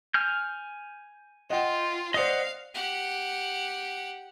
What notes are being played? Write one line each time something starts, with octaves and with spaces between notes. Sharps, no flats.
G#5 F6 G6
F4 D#5 F#5 G5
C5 D5 D#5 F5 F#5 D#6
G4 F#5